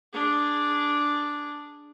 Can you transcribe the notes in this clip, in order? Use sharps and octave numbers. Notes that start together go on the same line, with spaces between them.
D4 G#4